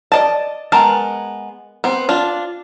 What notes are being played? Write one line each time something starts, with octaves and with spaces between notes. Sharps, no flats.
D5 D#5 A5
G#3 B3 A#4 A5
B3 C4
D4 F4